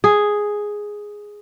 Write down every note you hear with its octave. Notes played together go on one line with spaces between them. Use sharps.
G#4